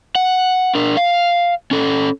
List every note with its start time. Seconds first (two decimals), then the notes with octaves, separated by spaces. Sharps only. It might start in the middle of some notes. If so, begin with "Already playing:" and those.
0.15 F#5
0.75 D4 A#4
0.97 F5
1.71 C#4 A4